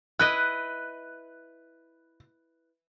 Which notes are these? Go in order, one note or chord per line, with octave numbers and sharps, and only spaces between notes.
E4 B4 D#5 F#6